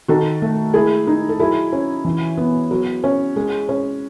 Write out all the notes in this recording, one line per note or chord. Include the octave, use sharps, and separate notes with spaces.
D#3 F#4 A4
A3
G#3 E4 G#4
D#4
A4
F#3 E4 G#4
C#4
E3
B3
F#3
C#4
G#3
C#4